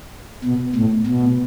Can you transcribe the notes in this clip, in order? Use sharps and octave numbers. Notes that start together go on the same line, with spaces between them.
B2
A2
B2